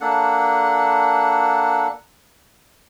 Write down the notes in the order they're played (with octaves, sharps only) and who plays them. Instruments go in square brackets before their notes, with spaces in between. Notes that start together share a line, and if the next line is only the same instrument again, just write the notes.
[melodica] A#3 D4 A4 F#5